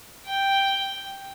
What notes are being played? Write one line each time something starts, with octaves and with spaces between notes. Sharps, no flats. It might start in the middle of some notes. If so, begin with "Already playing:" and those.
G5